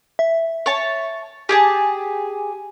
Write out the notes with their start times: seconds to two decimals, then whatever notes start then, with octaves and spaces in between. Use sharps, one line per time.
0.19 E5
0.66 C#5 A5
1.49 G4 G#4 G#5 A5